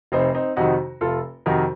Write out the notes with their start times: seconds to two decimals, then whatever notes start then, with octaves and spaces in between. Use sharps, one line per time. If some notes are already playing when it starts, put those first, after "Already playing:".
0.12 F1 C4 D#4
0.35 C4 D#4
0.56 F2 C3 D#3 D#4 F#4
1.01 F1 F4 A4
1.46 F2 C3 D#3 F#4 A#4